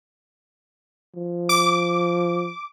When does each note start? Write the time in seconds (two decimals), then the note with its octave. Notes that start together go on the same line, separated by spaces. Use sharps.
1.16 F3
1.49 D6